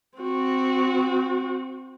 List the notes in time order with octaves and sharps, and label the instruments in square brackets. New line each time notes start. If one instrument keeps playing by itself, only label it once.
[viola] C4 F#4